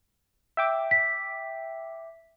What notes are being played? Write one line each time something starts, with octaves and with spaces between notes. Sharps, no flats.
E5 G5 D6
B6